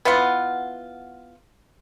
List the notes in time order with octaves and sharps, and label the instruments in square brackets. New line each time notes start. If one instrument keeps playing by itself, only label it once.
[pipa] B3 E4 F4 F#5